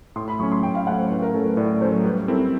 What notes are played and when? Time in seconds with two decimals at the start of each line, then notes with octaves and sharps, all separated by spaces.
0.16 A2 C6
0.28 B5
0.39 F#3 A3 C#4 C#6
0.52 C6
0.63 A2 G5
0.75 F5
0.86 F#3 A3 C#4 F#5
0.98 C5
1.10 A2 B4
1.22 A#4
1.34 F#3 A3 C#4 A4
1.46 B4
1.57 A2 D5
1.81 F#3 A3 C#4 C5
2.05 G3 B4
2.28 C4 E4 A4 A#4